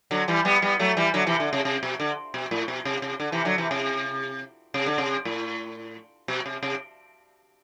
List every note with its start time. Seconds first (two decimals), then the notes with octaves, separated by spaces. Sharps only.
0.11 D3 F#3
0.28 E3 G3
0.45 G3 B3
0.62 G3 B3
0.79 F#3 A3
0.97 E3 G3
1.14 D3 F#3
1.27 C3 E3
1.40 D3
1.53 C3
1.65 C3
1.83 B2
2.00 D3
2.34 B2
2.51 A2
2.68 B2
2.85 C3
3.02 C3
3.20 D3
3.32 C3 E3
3.45 D3 F#3
3.58 C3 E3
3.71 C3
4.74 C3
4.86 D3
4.98 C3
5.25 A2
6.28 B2
6.46 C3
6.63 C3